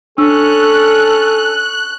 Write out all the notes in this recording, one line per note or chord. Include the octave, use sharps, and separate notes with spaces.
C#4 D4 A4 E6 F#6